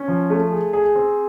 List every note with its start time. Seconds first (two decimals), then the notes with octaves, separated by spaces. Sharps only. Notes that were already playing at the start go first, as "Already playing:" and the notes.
Already playing: C#4
0.08 F3
0.30 A3
0.52 G#4
0.73 G#4
0.95 C4